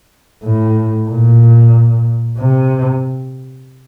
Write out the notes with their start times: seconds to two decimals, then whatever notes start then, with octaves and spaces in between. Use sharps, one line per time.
0.43 A2
1.09 A#2
2.39 C3